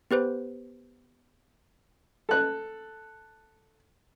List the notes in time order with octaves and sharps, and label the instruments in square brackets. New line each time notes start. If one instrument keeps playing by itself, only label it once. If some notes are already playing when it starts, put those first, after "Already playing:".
[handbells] B3 G4 B4 C5
[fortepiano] A4 F#6